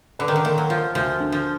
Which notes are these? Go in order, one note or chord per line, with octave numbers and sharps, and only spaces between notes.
D3 B4
D#3
D3
D#3 A#3
F#3
F3 F4
D2 F3
D3
F3